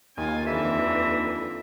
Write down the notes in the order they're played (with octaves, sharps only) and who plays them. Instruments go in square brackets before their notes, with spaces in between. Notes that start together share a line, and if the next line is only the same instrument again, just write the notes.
[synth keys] D#2 [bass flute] D#4 [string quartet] F4 G#5
[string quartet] F2 D3 E3 [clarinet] E5